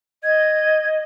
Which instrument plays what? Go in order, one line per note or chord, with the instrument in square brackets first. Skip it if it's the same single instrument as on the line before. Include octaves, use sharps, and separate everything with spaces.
[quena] D#5 [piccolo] G#6